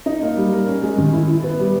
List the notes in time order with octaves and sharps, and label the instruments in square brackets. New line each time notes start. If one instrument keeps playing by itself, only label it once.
[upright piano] D#4
A#3
G3
A#4
C#4
G#3
D#3
E4
E4
B3
G3